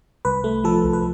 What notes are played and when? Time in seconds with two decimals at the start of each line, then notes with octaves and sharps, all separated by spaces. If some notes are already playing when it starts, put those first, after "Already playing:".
0.25 C2 B4
0.44 A3
0.64 F3 A4
0.84 C2
0.93 B4